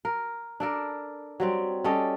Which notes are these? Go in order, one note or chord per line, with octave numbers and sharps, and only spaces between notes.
A#4
D4 A4 A#4
F#3 G3 C4
G3 C#4 A4 D#5